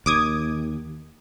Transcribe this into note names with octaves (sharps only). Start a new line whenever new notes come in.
D#2 D6 D#6 G#6